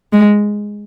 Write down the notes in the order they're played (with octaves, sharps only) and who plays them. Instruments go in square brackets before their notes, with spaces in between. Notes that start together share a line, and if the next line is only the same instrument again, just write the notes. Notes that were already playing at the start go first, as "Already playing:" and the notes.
[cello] G#3